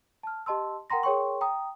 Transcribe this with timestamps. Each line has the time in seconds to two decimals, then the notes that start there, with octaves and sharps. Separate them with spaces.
0.23 A5 F6
0.46 G4 D#5 A5 C6 E6
0.90 A#4 F#5 G5 A#5 C6 A#6
1.03 G#4 A#4 C#5 G5 C6 C#6
1.41 G5 A#5 D#6